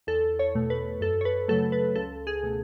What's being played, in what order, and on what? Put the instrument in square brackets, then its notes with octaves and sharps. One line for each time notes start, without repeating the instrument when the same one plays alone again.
[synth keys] E2 A4
C#5
B2 A3
B4
F#2 A4
C#5
B4
C#3 F#3 A3 A4
B4
C#2 A4
G#4
B2 A3